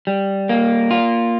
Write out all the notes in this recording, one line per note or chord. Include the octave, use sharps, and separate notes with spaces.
G3
A#3
F4